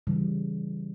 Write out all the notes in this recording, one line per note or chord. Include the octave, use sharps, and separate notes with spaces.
C#3 E3 G3